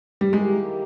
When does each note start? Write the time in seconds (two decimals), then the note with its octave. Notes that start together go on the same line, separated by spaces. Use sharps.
0.21 G3
0.33 D#3 G#3 A#3 E4 G4